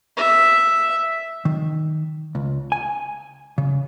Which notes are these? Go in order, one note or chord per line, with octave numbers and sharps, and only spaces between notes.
E5
D#3
C#2
G#5
C#3